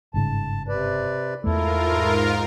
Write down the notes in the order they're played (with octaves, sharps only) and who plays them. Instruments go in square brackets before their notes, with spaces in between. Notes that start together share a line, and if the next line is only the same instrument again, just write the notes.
[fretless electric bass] G1 G#2 C#3 [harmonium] A5
[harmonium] C3 B4 D5
[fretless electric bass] E2 A3 [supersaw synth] G#2 F4 A#4 [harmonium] E4 A4